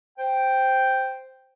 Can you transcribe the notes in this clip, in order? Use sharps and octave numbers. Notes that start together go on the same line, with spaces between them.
C5 G5